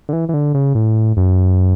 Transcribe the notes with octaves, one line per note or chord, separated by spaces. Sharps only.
D3
E3
E3
D3
C#3
A2
F#2